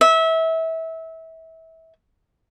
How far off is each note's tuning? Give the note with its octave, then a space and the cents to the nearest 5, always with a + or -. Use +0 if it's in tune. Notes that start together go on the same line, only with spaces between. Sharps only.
E5 -25